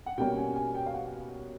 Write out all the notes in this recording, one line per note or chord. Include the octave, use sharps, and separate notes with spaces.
F#5
B2 G3 A#3 C#4 G5
G#5
G#5
G5
F5
F#5